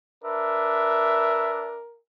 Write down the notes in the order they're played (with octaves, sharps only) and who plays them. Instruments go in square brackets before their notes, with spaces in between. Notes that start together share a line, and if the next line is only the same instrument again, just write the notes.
[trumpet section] D4 B4 E5 [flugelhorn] A#4